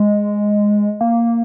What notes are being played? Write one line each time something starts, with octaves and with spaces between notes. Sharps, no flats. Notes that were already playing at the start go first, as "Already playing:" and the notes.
Already playing: G#3
A#3